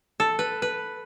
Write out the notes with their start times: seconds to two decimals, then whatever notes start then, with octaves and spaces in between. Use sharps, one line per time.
0.20 A4
0.39 B4
0.62 B4